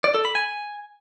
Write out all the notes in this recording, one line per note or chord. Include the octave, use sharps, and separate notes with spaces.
D5
A4
B5
G#5